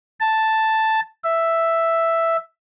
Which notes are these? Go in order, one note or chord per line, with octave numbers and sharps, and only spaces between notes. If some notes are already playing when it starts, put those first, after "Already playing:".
A5
E5